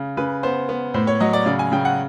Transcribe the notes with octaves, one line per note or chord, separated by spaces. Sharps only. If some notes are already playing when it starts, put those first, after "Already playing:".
Already playing: C#3
C#3 B4
B3 C5
B3
A2 C5
C#5
F#3 D#5
D5
C#3 D5
G#5
C#3 G5
F#5